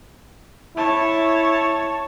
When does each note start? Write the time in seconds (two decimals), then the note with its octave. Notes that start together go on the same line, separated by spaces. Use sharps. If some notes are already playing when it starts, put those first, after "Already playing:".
0.77 E4 C#5 A5